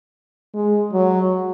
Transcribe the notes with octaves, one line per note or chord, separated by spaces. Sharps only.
G#3
F#3